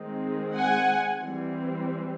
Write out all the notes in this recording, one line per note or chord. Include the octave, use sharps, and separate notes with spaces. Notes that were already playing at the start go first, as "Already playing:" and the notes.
Already playing: D#3 G#3 C4
F#5 G#5
E3 G3 C4